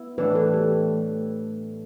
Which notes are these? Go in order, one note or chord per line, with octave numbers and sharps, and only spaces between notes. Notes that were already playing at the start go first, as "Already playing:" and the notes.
Already playing: B3 E4
A2 E3 A3 D4 B4
A4
G4